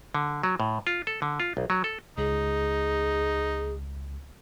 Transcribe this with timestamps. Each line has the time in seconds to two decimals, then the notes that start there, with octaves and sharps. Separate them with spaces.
0.15 D3
0.43 F#3
0.60 A2
0.87 F4
1.07 A4
1.22 D3
1.40 F4
1.57 B1
1.70 F#3
1.84 A4
2.18 C#2 D#4 G#4